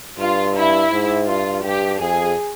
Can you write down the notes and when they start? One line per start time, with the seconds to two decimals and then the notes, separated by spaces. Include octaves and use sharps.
0.18 G2 F4
0.55 E4
0.92 G#2
1.28 G2 F4
1.64 G2 G4
2.00 F2 G#4